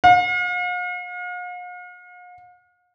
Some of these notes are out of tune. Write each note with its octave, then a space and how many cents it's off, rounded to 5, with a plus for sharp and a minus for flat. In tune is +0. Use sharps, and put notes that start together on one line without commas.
F5 +45